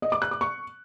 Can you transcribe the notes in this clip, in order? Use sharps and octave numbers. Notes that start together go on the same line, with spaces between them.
D#5
D6
F#6
D6
C#6